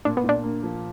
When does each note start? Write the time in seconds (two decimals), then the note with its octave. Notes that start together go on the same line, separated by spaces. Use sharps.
0.05 A#2 D4
0.17 B3
0.24 A#2 D4
0.43 A#3
0.63 F3